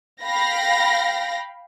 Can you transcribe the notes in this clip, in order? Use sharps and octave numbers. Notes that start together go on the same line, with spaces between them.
F5 G5 B5 A#6